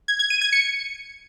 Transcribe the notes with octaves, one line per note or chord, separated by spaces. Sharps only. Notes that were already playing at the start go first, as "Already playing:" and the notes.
G#6
G#6
D#7
G#6
C#7